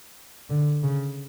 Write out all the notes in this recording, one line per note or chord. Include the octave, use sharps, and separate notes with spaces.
D3
C#3